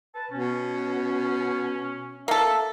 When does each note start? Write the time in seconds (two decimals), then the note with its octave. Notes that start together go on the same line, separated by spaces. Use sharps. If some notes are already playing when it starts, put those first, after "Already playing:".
0.15 B4 A5
0.31 B2 C#4
2.28 A#3 A4 E5